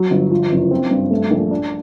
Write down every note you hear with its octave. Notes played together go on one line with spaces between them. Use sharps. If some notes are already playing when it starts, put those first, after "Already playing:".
Already playing: F#3
G1
F3
F#1
C4
G2
A3
A#1
D4